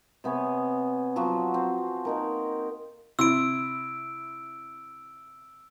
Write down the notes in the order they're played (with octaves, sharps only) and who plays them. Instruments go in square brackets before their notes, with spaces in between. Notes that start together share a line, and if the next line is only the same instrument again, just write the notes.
[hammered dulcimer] C3 B3 G#4 C#5
F3 F#3 B3 F#4
C4
A#3 D#4 A#4
[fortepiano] C3 E4 C6 [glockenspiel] E6 D7